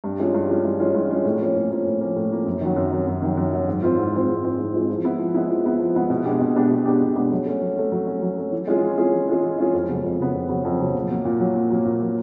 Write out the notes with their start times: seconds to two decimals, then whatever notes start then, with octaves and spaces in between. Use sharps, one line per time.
0.04 G2
0.19 E3 G#3 C#4 F4
0.34 G2
0.50 E3 G#3 C#4 F4
0.64 G2
0.80 E3 G#3 C#4 F4
0.95 G2
1.10 E3 G#3 C#4 F4
1.25 A2
1.41 F3 A#3 C#4
1.56 A2
1.71 F3 A#3 C#4
1.86 A2
2.01 F3 A#3 C#4
2.16 A2
2.31 F3 A#3 C#4
2.46 F#2
2.61 D#3 F#3
2.76 F#2
2.92 D#3 F#3
3.07 F#2
3.22 D#3 F#3
3.37 F#2
3.52 D#3 F#3
3.68 G#2
3.83 E3 G#3 C4 F4
3.98 G#2
4.13 E3 G#3 C4 F4
4.28 G#2
4.43 E3 G#3 C4 F4
4.58 G#2
4.74 E3 G#3 C4 F4
4.89 F3
5.04 G#3 B3 E4
5.19 F3
5.34 G#3 B3 E4
5.49 F3
5.65 G#3 B3 E4
5.80 F3
5.95 G#3 B3 E4
6.10 B2
6.25 G#3 B3 D4 G4
6.40 B2
6.55 G#3 B3 D4 G4
6.70 B2
6.86 G#3 B3 D4 G4
7.01 B2
7.16 G#3 B3 D4 G4
7.31 F#3
7.46 A3 C#4
7.61 F#3
7.77 A3 C#4
7.92 F#3
8.07 A3 C#4
8.22 F#3
8.37 A3 C#4
8.52 E3
8.68 G#3 C#4 F4 G#4
8.83 E3
8.98 G#3 C#4 F4 G#4
9.13 E3
9.28 G#3 C#4 F4 G#4
9.43 E3
9.59 G#3 C#4 F4 G#4
9.74 F2
9.89 C#3 F#3 B3
10.04 F2
10.19 C#3 F#3 B3
10.34 F2
10.49 C#3 F#3 B3
10.65 F2
10.79 C#3 F#3 B3
10.95 A#2
11.10 F#3 A#3
11.25 A#2
11.40 F#3 A#3
11.55 A#2
11.70 F#3 A#3
11.85 A#2
12.01 F#3 A#3